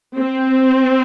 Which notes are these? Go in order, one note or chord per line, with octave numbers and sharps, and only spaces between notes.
C4